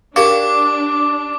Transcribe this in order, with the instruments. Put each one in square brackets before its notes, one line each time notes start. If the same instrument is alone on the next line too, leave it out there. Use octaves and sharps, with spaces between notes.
[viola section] D4 [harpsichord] G4 C#5 [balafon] A#4 F5 [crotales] D6